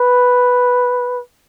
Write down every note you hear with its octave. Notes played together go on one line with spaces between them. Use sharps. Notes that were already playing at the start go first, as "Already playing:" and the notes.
Already playing: B4